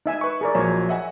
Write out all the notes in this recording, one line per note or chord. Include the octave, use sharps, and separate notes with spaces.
D#4 E5 G#5
B4 C#6
G#4 A#4 D5
A#1 F3 F#3 C#5
D#5 E5 F#5 G#5